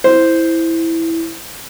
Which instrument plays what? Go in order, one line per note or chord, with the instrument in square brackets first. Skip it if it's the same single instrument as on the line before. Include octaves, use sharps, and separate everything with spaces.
[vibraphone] E4 [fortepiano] C5